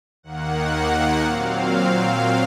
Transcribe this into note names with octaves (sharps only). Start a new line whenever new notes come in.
D#2 D#3 A#3 F#5
A#2 F#3 C4 F5